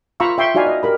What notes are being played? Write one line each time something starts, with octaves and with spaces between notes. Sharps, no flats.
F4 F5 A#5 B5 C#6 E6
E5 G5 C6 C#6
D#4 F#4 D5 F5 G#5 B5
D#5
G4 A#4 B5